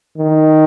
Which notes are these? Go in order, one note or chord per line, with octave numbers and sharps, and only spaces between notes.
D#3